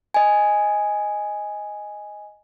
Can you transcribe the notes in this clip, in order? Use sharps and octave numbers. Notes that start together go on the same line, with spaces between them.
D#5 G#5